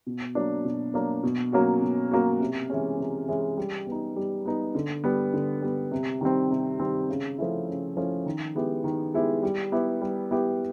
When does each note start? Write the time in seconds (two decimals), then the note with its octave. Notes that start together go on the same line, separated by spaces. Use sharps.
0.07 B2
0.35 F#3 A#3 D4
0.65 B2
0.94 F#3 A#3 D4
1.23 B2
1.52 F#3 A#3 C#4 F#4
1.82 B2
2.11 F#3 A#3 C#4 F#4
2.40 C3
2.70 E3 G#3 C#4
2.99 C3
3.28 E3 G#3 C#4
3.57 G3
3.87 B3 D#4
4.16 G3
4.45 B3 D#4
4.75 D3
5.04 G3 B3
5.33 D3
5.62 G3 B3
5.92 C3
6.21 D#3 G3 C4
6.50 C3
6.79 D#3 G3 C4
7.09 C#3
7.38 F3 A3 C#4 E4
7.67 C#3
7.96 F3 A3 C#4 E4
8.26 D#3
8.55 G#3 B3 E4 G4
8.84 D#3
9.14 G#3 B3 E4 G4
9.43 G3
9.72 B3 E4 G4
10.01 G3
10.31 B3 E4 G4